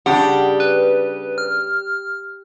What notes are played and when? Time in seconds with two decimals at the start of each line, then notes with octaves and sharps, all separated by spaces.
0.06 C#3 G3 D4 G4 F#5
0.60 B4
1.38 F6